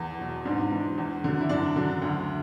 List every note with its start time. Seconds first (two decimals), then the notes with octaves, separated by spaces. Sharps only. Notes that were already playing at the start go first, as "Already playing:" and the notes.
Already playing: E2
0.19 B2 F#3
0.45 G#2 D4
0.71 E3
0.98 E2
1.24 D3 F#3
1.41 E4
1.49 F#2 D4
1.76 D3 F#3
2.02 D2